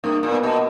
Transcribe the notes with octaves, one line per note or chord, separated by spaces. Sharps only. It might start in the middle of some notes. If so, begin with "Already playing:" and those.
G2 A#3
A#2
B3
B2